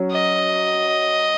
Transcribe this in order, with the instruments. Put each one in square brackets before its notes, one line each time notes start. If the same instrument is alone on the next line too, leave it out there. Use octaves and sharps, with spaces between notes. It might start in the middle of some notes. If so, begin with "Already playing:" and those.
Already playing: [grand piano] F#3 C#4
[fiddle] D#5